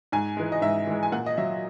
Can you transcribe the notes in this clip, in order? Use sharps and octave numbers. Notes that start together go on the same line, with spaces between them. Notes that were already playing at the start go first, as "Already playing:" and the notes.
G#2 G#5
E3 G#3
D#5
G#2 E5
E3 G#3
G#5
A#2 F#5
D#5
F#3 E5